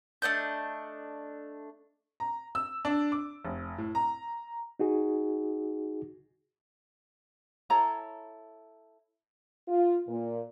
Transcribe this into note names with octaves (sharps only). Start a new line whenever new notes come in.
A3 D4 D#5 G6
A#5
E6
D4
D6
F1
A2
A#5
D#4 F#4 G#4
E4 A4 C#5 A#5
F4
A#2